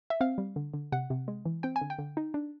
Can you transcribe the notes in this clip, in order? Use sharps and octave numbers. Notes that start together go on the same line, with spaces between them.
E5
C4 F5
G3
D3
D3
C3 F#5
C3
G#3
E3
C4 G5
G#5
D3
G5
D3
D#4
D4